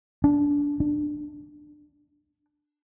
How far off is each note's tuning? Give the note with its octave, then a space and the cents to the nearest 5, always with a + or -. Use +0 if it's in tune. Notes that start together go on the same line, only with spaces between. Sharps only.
D4 -20
D4 +15